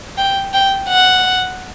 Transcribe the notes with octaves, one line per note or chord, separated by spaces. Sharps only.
G5
G5
F#5